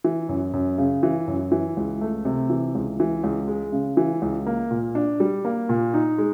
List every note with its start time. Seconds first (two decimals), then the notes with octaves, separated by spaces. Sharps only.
0.04 E3
0.29 F#2
0.53 F#2
0.78 C#3
1.03 E3
1.28 F#2
1.52 E3
1.77 C#2
2.01 A3
2.25 C3
2.50 E3
2.75 C#2
3.00 E3
3.24 C#2
3.48 G#3
3.72 C#3
3.97 E3
4.22 C#2
4.46 A#3
4.71 A#2
4.95 D4
5.20 G3
5.45 A#3
5.69 A#2
5.94 D#4
6.18 G#3